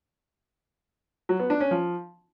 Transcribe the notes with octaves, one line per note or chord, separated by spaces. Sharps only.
F#3
B3
D4
C#4
F3